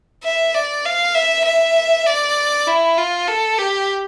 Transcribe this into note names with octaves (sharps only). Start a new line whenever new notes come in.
E5
D5
F5
E5
E5
D5
E4
F4
A4
G4